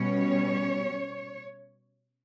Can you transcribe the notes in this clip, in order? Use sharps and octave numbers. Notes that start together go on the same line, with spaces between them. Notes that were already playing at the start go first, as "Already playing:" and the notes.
Already playing: B2 G3 C#4 C#5